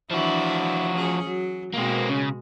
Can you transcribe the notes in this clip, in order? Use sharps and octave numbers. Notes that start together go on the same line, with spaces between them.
E3 F3 D4 E4 F#4
C#4 G#4
F#3
B2 G#3 A#3 C4
C#3